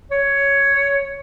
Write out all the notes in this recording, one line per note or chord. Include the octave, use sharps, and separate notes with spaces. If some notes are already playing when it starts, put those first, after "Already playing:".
C#5